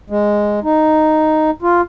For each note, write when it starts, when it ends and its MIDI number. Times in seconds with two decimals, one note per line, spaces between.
0.10 0.60 56
0.64 1.50 63
1.62 1.81 65